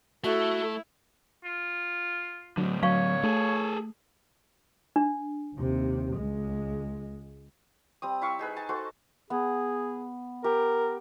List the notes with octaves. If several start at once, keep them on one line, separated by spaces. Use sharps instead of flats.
A3 E4 F#4 A4
F4
A2 D3 F#3
F#3 C#5 F5 C#6
A3 G#4 A4
D4
D#2 C3
C#2 G#3
G3 C4 D#6
E4 E5 F5 C#6
D#4 G#4 B4
D#4 G#5 A5
D#4 F#4 A4 C5
B3 G#4
G4 A#4